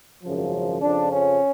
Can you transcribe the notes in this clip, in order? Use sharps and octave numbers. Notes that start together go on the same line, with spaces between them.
G#1 F#2 C#3 F3
F2 C#3 F3 D4
C#4